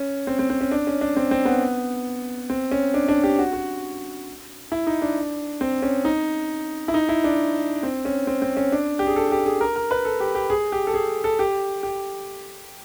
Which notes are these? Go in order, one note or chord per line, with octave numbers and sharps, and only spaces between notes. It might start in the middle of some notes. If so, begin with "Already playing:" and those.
Already playing: C#4
C4
C4
C4
C#4
D4
C#4
D4
C4
C4
B3
C4
C#4
D4
D4
G4
F#4
F#4
E4
D#4
D4
C4
C#4
D#4
E4
D#4
E4
D4
C4
C#4
C4
C4
C#4
D4
G4
G#4
A4
G4
G#4
A#4
A#4
B4
A4
G4
G4
G#4
G4
A4
G#4
A4
G4
G4